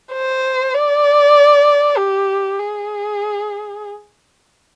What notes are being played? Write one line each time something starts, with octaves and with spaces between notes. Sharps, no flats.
C5
D5
G4
G#4